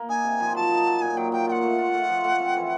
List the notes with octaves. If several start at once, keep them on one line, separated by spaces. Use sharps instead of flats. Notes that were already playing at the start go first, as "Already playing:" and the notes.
Already playing: A#3
D#4 G#5
C3
F3
F#3 A5
D#4
F#3
A#2 G#5
F#3 G5
A#3 G5
F4 F#5 G5
A3
F4
A3
F3
A3
C4
E3